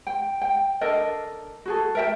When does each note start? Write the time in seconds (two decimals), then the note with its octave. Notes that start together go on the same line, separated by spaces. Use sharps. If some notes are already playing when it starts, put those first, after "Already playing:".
0.07 G5
0.42 G5
0.81 D4 A4 A#4 D#5
1.66 F#4 G#4 A4
1.95 A#4 E5 G5